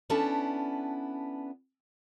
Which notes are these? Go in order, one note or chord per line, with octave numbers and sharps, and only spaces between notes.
B3 C#4 D4 E4 A4